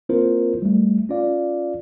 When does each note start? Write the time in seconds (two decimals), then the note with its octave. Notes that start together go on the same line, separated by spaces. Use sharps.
0.09 A#3 C4 E4 F4 A#4 C5
0.62 G3 A3
1.09 C#4 F4 D5 F5